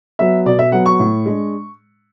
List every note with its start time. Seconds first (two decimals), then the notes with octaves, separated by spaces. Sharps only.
0.19 F#3 B3 E5
0.46 B2 D5
0.59 E5
0.72 F#3 B3 F#5
0.86 C#6
0.99 A2
1.26 G#3 D4